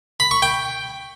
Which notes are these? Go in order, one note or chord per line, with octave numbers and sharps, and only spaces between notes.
B5
C#6
G5